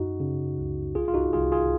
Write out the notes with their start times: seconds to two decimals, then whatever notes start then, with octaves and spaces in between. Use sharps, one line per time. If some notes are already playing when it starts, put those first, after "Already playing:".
Already playing: F#2 D#4 F#4
0.20 C#3
0.58 C#2
0.95 C2 F4 G#4
1.08 F4
1.14 D#4 F#4
1.33 C2 F4 G#4
1.52 F4 G#4